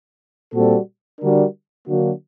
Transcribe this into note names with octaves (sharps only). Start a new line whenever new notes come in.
A#2 G3 C4 F#4 A4
D3 G3 D4 F#4 A#4
D3 F#3 A#3 D4 F#4